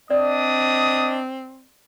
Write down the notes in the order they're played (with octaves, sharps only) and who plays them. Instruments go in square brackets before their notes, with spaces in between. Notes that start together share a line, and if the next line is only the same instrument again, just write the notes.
[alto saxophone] C4 [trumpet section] D4 D#5 D#6 [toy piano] D5